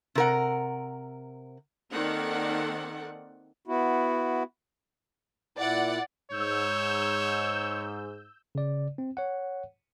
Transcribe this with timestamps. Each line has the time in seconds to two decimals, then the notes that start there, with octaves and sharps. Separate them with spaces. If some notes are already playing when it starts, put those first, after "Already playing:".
0.15 C3 A#4 F#5
1.91 D#3 A#3 C4 A4 D5 F#5
3.67 B3 E4 F#4
5.58 A#2 E4 D5 F#5
6.32 G#2 C#5 E6 G6
8.55 C#3 D5
8.98 C4
9.17 C#5 F#5